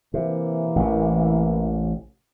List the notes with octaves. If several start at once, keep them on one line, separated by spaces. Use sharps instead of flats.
C3 E3 A#3
A1 C3